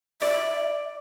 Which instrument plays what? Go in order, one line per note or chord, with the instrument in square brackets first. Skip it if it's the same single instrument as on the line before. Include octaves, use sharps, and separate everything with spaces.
[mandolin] D5 [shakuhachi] E5